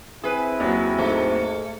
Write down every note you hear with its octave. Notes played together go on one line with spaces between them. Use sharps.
C4 E4 G#4 B4
D#2 F#3
G#2 A3